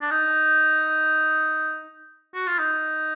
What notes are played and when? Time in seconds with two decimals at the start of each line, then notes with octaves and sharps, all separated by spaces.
0.01 D4
0.11 D#4
2.35 F#4
2.47 F4
2.59 D#4